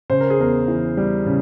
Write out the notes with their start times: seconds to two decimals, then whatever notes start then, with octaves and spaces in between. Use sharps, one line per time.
0.10 C#3 C5
0.21 A#4
0.30 G#4
0.39 E2 A#4
0.68 E3
0.97 G3
1.26 C#3